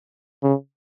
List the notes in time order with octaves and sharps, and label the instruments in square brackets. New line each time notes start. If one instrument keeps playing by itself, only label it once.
[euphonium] C#3